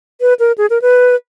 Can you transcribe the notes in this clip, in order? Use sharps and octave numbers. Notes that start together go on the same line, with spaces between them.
B4
A#4
G#4
A#4
B4